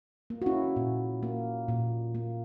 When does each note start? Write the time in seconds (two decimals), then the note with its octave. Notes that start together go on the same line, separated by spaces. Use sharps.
0.30 A#3
0.42 F#4
0.46 C#4 E4
0.76 A#2
1.23 A#3
1.68 A#2
2.15 A#3